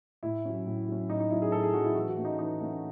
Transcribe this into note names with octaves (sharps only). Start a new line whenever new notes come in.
A2 E4
F#3 C#4
A2
F#3 C#4
A2 D#4
D#4
F#3 C#4 E4
G#4
A2 A4
G#4
F#3 C#4 F#4
E4
E3 F#4
F#4
A3 C#4
D#4
E3 D#4
A3 C#4